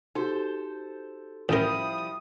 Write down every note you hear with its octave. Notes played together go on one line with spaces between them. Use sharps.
D#4 F#4 G4 A4 C5
A1 F3 G3 E4 A#4 D#6